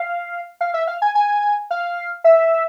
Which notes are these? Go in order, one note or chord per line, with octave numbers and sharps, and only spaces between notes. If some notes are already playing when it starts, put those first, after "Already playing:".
Already playing: F5
F5
E5
F5
G#5
G#5
F5
E5